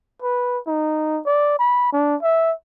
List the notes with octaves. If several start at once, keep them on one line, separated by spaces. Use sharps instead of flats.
B4
D#4
D5
B5
D4
E5